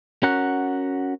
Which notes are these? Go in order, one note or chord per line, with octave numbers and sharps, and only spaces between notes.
C#4 F#4 A#4 F#5